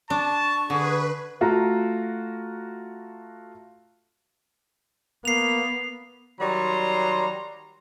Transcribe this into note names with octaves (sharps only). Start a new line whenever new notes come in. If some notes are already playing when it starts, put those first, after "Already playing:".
D4 A5 C#6
D3 G#4 B4
A3 F4 F#4 A#5
A#3 B3 C7 F7
D#3 F#3 G3 A#5 C6